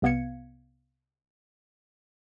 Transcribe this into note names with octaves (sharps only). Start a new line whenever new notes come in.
C2 C3 B3 F5 G#6 C#7